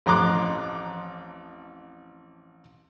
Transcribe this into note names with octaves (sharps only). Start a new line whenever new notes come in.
A1 F2 A#5 C6 D6 F#6